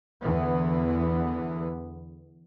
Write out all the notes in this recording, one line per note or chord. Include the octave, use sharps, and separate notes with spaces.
E2 D3 E3 B3